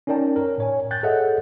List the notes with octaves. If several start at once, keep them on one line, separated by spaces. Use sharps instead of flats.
C#4 D#4 A#4 D5 G5 A5
A#4 C#5
A2 C#5 G#5
G5 F#6 G6 A6
G#4 A4 C#5 D#5 E5 F#5